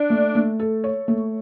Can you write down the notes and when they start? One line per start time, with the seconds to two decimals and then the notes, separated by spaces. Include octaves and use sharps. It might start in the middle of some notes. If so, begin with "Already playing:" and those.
Already playing: D4
0.10 A3
0.35 A3
0.59 A4
0.84 C#5
1.08 A3